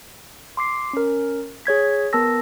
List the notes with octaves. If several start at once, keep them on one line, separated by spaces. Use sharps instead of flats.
C6 D6 C7
C#4 A#4
G#4 C#5 G#6 B6
B3 A#4 A5 E6 A#6